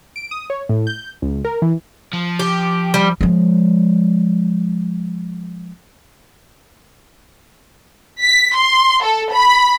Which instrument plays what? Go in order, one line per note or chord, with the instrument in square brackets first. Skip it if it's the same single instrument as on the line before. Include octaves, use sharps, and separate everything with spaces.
[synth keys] D7
D#6
C#5
A2
G6
C#2
A#4
E3
[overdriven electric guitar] F3
[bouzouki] G4
G3
[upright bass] F3 G#3
[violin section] B6
C6
A4
B5